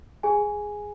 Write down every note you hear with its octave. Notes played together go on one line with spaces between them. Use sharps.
G#4 G#5